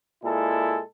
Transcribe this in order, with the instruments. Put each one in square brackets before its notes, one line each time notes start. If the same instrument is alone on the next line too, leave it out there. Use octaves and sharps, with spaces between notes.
[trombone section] A#2 G#3 E4 A4